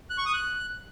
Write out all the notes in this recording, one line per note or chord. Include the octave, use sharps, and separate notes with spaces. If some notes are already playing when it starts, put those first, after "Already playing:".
F#6
C#6
D#6
F#6